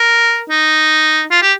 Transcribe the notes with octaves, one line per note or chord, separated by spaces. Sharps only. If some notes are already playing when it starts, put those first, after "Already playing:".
Already playing: A#4
D#4
F4
G4